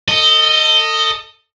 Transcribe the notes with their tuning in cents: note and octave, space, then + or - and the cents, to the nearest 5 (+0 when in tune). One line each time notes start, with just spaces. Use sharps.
A4 +30 D#5 +0